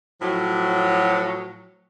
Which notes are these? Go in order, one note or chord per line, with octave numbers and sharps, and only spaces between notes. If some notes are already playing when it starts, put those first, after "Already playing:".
A2 F3 F#3